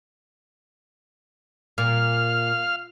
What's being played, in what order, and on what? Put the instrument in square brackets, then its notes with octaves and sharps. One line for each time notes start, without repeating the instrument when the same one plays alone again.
[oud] A#2 [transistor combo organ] F5 F6